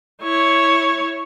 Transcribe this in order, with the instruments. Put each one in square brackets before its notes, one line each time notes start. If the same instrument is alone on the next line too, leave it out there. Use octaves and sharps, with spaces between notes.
[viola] E4 C#5